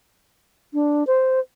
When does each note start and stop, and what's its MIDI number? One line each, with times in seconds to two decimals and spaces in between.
0.74 1.04 62
1.07 1.40 72